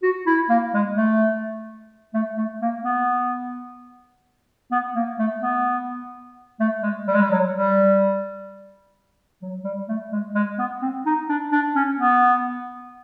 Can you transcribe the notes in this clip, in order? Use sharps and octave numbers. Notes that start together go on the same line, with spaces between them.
F#4
E4
A#3
G#3
A3
A3
A3
A#3
B3
B3
A#3
A3
B3
A3
G#3
G3
G#3
G3
F#3
G3
F#3
G3
A3
G#3
G#3
B3
C4
D#4
D4
D4
C#4
B3